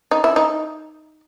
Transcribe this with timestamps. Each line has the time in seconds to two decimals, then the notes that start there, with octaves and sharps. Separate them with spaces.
0.11 D#4
0.24 E4
0.36 D#4